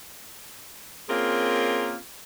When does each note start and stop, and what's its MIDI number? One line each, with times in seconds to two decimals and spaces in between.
1.09 1.95 58
1.09 1.95 60
1.09 1.95 61
1.09 1.95 65
1.09 1.95 68
1.09 1.95 70